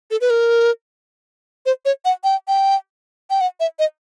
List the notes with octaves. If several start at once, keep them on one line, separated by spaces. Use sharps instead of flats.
A4
B4
A#4
C5
C#5
F#5
G5
G5
G5
F#5
E5
D#5